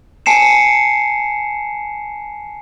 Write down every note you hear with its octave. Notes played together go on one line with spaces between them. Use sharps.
G#5 A5 C7 C#7 E7